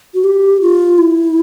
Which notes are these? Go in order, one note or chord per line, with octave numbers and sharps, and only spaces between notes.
F#4
G4
F4
E4